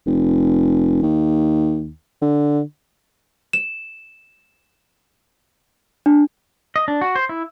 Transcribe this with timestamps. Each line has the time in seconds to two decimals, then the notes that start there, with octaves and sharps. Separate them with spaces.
0.07 F1
1.03 D#2
2.22 D3
3.53 E7
6.06 D4
6.76 D#5
6.88 D4
7.01 F#4
7.16 C5
7.29 E4